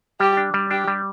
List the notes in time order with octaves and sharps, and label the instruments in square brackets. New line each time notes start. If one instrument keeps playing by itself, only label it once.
[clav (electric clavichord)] G3 [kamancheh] G4
[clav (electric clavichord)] D4
G3
[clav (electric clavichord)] D4 [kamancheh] G4
[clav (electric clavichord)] G3